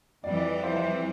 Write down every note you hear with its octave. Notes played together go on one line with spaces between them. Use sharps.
F2 E3 G3 D5
D5
D5
C5 E5
C5 E5